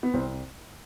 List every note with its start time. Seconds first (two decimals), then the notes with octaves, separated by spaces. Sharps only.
0.03 B3
0.14 C2 C4